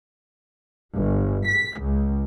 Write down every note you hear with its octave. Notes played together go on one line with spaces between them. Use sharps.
G1
B6
C#2